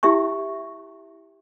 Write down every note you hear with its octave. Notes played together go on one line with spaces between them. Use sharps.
E4 G4 E5 G5 C#6